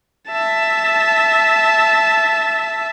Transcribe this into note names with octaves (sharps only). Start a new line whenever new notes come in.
E5 A5